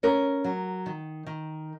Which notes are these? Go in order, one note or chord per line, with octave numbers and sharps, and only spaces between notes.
C#4 A#4
F#3
D#3
D#3